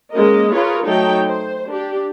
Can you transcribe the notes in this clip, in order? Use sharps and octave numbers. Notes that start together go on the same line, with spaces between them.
G#3 A#3 C#4 A#4 D#5
F4 G#4 A#4 B4 C#5
F#3 A3 D#4 A4 C#5 G5
C5
D4 G4